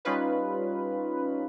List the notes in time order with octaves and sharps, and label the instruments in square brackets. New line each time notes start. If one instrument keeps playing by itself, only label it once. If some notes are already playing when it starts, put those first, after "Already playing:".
[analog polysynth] G3 C#4 D#4 F4 B4